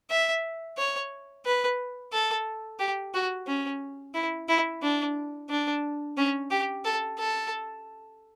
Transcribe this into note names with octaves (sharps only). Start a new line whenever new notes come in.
E5
C#5
B4
A4
G4
F#4
C#4
E4
E4
D4
D4
C#4
G4
A4
A4